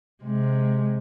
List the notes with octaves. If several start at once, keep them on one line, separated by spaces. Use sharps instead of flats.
C3 G#3